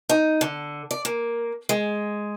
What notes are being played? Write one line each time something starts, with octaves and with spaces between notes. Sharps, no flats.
D#4
D3
D5
A#3
G#3